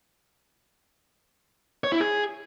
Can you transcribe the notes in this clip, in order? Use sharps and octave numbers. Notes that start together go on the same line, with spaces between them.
C#5
E4
G#4